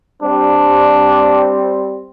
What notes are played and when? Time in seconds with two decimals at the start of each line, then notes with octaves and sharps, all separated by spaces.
0.23 G3 C4 D4